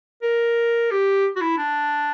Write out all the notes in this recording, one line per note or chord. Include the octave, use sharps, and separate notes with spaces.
A#4
G4
F#4
E4
D4